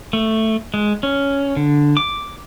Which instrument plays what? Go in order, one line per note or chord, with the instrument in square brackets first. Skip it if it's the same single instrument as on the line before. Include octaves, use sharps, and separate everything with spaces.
[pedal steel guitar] A3
G#3
C#4
D3
D6